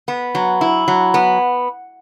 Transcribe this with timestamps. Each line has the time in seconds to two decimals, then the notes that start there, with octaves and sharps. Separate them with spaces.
0.08 B3
0.35 F#3
0.61 E4
0.88 F#3
1.14 B3